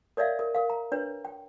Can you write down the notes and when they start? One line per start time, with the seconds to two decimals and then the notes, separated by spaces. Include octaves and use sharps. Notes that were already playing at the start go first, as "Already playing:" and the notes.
0.17 A#4 C#5 D5 E5 F5
0.39 A#4
0.55 A#4 F5
0.70 A#5
0.92 D4 B4 C#5
1.25 G5